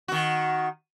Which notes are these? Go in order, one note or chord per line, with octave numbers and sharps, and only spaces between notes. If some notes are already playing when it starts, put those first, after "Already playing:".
D#3 F#4